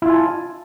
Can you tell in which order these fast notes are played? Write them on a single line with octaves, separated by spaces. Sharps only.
E4 F4 G#5 A5